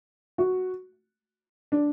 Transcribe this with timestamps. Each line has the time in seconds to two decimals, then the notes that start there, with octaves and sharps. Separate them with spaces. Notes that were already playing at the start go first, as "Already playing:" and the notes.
0.38 F#4
1.72 D4